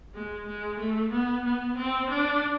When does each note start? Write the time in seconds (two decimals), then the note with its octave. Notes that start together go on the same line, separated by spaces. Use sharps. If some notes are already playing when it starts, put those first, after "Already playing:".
0.14 G#3
0.47 G#3
0.80 A3
1.12 B3
1.45 B3
1.78 C4
2.11 D4